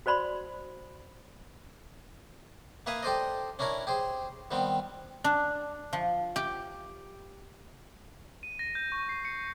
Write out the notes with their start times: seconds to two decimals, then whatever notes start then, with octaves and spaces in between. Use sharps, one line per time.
0.06 F#4 C5 D5 B5 C6
2.86 A#3 B4 E5 F5 G#5 D#6
3.03 G4 A4 C5 D5 D#5
3.59 C#4 D4 E4 A#4 C#5
3.87 G4 G#4 C5
4.51 D#3 G3 B3 C4
5.24 D4
5.93 F3
6.36 G4
8.43 D#7
8.59 A#6
8.75 G6
8.92 C#6
9.09 C7
9.25 C#7